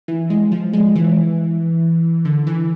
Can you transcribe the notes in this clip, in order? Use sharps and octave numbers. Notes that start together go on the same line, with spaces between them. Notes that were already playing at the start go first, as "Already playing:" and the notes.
E3
G#3
F3
G#3
E3
D3
E3